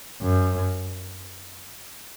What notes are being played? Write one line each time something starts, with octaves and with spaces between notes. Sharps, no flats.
F#2